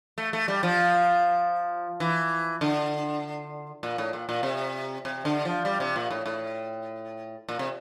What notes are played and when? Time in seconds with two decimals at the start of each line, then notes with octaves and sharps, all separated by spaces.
0.18 A3
0.33 A3
0.48 G3
0.63 F3
2.00 E3
2.61 D3
3.83 A#2
3.98 A2
4.13 A#2
4.29 A#2
4.43 C3
5.05 C3
5.25 D3
5.45 F3
5.65 G3
5.80 C3
5.96 A#2
6.10 A2
6.26 A2
7.49 A#2
7.59 C3